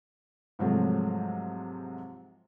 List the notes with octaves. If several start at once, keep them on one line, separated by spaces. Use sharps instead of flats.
G#2 C3 F3 F#3 G#3 A3